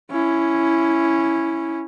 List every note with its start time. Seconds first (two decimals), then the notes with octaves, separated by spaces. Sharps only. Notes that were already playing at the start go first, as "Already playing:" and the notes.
0.11 C#4 E4